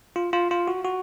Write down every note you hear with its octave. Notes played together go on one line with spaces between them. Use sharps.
F4
F4
F4
F#4
F#4